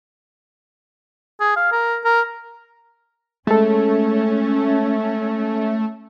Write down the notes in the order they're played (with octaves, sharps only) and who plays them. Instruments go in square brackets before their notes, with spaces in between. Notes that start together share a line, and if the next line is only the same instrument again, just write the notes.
[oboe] G#4
F5
A#4
A#4
[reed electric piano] G#3 A4 [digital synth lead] A3 [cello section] C#4